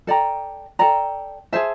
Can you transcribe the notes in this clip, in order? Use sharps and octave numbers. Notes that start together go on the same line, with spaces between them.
A4 D5 G5 A#5
A4 D5 G5 A#5
G#4 C5 E5 A5